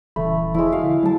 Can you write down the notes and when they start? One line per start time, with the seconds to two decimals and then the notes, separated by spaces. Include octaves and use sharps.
0.16 D#1 C#3 E3 A3 B5
0.54 E2 F3 G#3 E4
0.72 F#4 F5
0.84 D3
1.03 F#3 A3 E4 A#4 A5